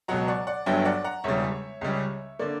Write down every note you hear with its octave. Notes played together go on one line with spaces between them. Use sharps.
C#2 B2 F#3 F#5 A#5
D5 F#5
D5 F#5
G1 G2 F#3 C#4 E5 G5
D5 F#5
F#5 A#5
E1 E2 C#3 G3 C#5 E5
C#2 C#3 G3 C#4
D3 A#3 D5